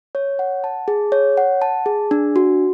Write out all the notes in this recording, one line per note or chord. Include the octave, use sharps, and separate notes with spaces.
C#5
F#5
A5
G#4
C#5
F#5
A5
G#4
D4
F#4